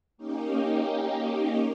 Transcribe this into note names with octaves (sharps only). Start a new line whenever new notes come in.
A#3 C#4 D#4 G4